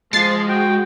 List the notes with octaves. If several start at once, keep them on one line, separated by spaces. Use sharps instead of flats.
F3 G#3 A6 C7
F#4 G5